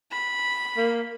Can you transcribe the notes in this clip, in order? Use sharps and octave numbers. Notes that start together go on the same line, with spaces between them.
B5
A#3